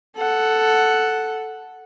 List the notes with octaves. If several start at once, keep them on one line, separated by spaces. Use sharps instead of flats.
A4 F#5